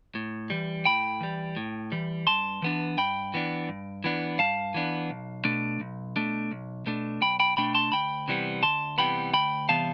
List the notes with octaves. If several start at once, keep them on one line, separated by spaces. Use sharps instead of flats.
A2
E3 G3
A2 G5 B5
E3 G3
A2
E3 G3
G2 A5 C6
E3 B3 D4
G2 G5 B5
E3 B3 D4
G2
E3 B3 D4
G2 F5 A5
E3 B3 D4
B1
B2 A3 D4
B1
B2 A3 D4
B1
B2 A3 D4
B1 G5 B5
G5 B5
B2 A3 D4 G5 B5
A5 C6
D2 G5 B5
C3 E3 G3 B3
D2 A5 C6
C3 E3 G3 B3 G5 B5
D2 G5 B5
C3 E3 G3 B3 F5 A5